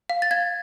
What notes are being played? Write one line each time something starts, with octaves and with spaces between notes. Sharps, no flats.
F5
A6
F5 G#6